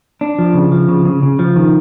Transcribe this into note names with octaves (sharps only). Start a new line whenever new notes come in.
D4
F3
C#3
F3
C#3
C#3
C#3
F3
D#3